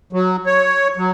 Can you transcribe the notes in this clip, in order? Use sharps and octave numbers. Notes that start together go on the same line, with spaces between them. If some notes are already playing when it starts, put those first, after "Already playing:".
F#3
C#5
F#3